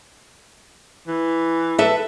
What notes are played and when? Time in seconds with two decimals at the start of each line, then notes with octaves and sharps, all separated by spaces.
1.07 E3
1.79 A4 B4 E5